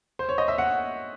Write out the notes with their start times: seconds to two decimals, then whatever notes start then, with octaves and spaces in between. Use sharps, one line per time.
0.19 C5
0.29 C#5
0.38 D#5
0.48 E5
0.58 F#5